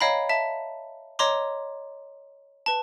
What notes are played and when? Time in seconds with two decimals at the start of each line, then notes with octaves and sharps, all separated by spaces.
0.01 C#5 D#5 F5 G5 A#5 B5
0.29 E5 A5
1.19 C#5 D#5 A#5 C6 D6
2.66 B4 A5